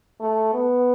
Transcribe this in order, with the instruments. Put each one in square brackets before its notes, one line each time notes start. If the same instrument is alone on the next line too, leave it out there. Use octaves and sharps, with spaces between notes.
[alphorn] A3
B3